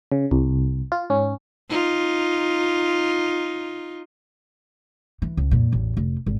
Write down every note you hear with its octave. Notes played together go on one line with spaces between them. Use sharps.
C#3
C2
F4
G#2 C#4
D#4 F4
E3
C#2
F2 A#2
A1 E2
F1
G#1